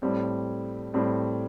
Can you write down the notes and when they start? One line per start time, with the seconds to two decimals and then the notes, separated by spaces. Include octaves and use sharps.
0.02 A2 G3 C4
0.94 A2 G3 C4